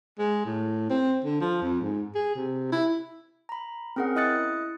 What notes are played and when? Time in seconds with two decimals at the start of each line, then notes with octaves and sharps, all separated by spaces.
0.19 G#3
0.46 A2
0.90 C4
1.25 D3
1.41 F3
1.62 F2
1.81 G#2
2.15 G#4
2.35 C3
2.72 E4
3.49 A#5 B5
3.96 C4 C#4 G#4 A#4 F#5
4.16 E4 D#5 D#6 F#6 A6 C#7